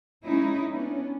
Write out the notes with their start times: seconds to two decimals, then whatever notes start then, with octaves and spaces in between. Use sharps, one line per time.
0.24 G#3 C#4 D#4 E4
0.73 B3 C#4 D4